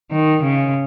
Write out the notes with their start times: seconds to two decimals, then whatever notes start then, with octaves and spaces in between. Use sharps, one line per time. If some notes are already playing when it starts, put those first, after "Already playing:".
0.11 D#3
0.43 C#3